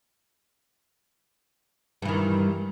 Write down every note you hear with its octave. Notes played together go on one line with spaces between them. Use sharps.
G2 D#3 E3